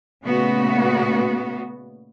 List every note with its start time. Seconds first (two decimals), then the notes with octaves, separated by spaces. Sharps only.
0.25 A#2 C#3 A3 B3 F#4